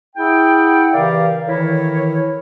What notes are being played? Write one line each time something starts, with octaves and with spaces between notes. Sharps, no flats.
E4 G#4 F#5 G5
C#3 E3 G4 A#4 D5 F5
D#3 E3 E4 A4 A#4 C#5